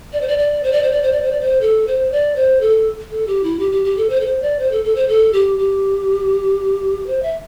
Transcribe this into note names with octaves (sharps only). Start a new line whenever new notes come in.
D5
C5
D5
D5
C5
D5
C5
D5
C5
D5
C5
D5
C5
A4
C5
D5
C5
A4
A4
G4
E4
G4
G4
G4
A4
C5
A4
C5
D5
C5
A4
A4
C5
A4
G4
G4
C5
E5